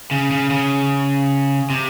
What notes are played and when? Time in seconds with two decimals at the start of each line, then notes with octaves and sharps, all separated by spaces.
0.11 C#3
0.31 C#3
0.50 C#3
1.70 C3